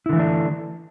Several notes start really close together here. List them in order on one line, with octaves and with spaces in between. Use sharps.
E4 D3 E3 A3 D4